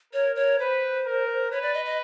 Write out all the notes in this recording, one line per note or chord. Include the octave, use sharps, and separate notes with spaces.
A#4 C#5
C#5
B4 C5
A#4
B4 C#5
D5
D#5
D#5